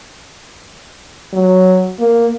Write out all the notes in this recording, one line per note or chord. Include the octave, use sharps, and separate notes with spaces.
F#3
A#3